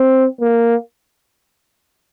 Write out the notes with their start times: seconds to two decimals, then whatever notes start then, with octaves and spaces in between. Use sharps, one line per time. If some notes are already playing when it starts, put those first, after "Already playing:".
Already playing: C4
0.41 A#3